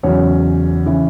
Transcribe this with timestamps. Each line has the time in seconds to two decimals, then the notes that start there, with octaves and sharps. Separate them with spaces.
0.03 E2 C#3 F#3 C#4 C#5
0.86 C#3 E3